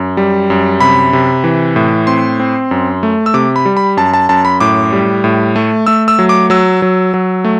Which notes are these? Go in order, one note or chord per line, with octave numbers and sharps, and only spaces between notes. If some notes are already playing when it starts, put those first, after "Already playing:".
Already playing: F#2
G3
F#2
C3 B5
C3
E3
A2
C4 C6
C4
F#2
A3
E6
C3 D6
B5
G3
B5
F#2 A5
A5
F#2 A5
B5
A2 D6
G3
A2
A3
A3 E6
E6
F#3
D6
F#3 E6
F#3
F#3
A3